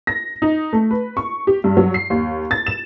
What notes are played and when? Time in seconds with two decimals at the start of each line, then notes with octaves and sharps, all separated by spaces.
0.07 A#6
0.42 D#4
0.73 A3
0.91 B4
1.17 C#6
1.47 G4
1.64 G2
1.77 F#3
1.94 C7
2.10 D#2
2.51 A6
2.67 E7